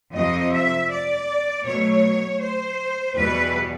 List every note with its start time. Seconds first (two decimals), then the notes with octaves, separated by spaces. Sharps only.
0.14 F2 C3 F3 D#5
0.52 E5
0.90 D5
1.65 B2 F#3 A3 C#5
2.41 C5
3.16 E2 B2 G3 B4